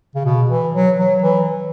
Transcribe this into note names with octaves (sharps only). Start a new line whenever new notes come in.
C#3
B2
E3
F#3
F#3
E3